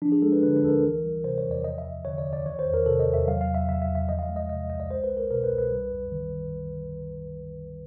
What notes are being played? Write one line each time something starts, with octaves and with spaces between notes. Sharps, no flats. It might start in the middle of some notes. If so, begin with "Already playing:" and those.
F3 D4
G#4
G#3 A4
B4
D3 B4
B4
D2 A4
A#4
E3
G3
C3 C5
C#5
E2
D5
F3 D#5
E5
D2
D3 C#5
D5
D2
D5
D#3 C#5
C5
E2
A#4
C3 A4
D#5
E2
E5
F#3 F5
F5
E2
E5
C#3 E5
E5
E2
E5
F3 D#5
F5
E5
G#3
D#5
C3 D#5
C2 D#5
D5
G#3 C5
B4
C2
A#4
B2 A#4
B4
C2
B4
G3
F#2
D#3